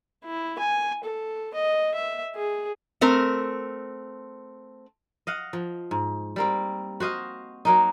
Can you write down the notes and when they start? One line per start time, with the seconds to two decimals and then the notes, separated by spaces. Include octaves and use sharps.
0.25 E4
0.58 G#5
1.04 A4
1.54 D#5
1.94 E5
2.36 G#4
3.01 A3 C4 A#4
5.27 D#5 F5 F#5
5.53 F3
5.91 G#2
6.36 G3 A#3 C4
7.00 F#4 C5 D#5 F5
7.65 F#3 A#3 D#4